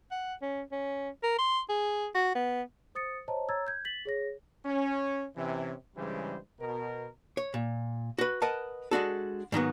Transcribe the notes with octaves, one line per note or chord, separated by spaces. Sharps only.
F#5
C#4
C#4
A#4
C6
G#4
F#4
B3
C5 D#6 A6 C#7
C5 C#5 D#5 A5 A#5
C#5 A#5 E6 G#6 A6
G6 G#6
A6 B6 F#7
G#4 C#5 A#6
C#4
C3 E3 C#4
G2 C#3 E3 G3 G#3 C5
B2 A#4
C#5
A#2
F#4 B4
A#4 B4 D#5 F#5 A5
G#3 D4 F#4 A4
G#2 D#3 F#3 B3